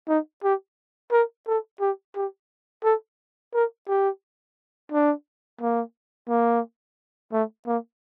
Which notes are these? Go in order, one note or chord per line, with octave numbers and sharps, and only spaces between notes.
D#4
G4
A#4
A4
G4
G4
A4
A#4
G4
D4
A#3
A#3
A3
A#3